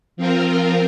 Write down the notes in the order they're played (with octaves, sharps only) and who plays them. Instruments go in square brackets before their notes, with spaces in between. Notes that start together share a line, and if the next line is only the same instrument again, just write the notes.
[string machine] F3 C4 F4 A#4